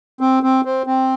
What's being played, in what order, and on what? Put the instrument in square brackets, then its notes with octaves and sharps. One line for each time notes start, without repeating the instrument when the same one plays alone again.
[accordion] C4
C4
C4
C4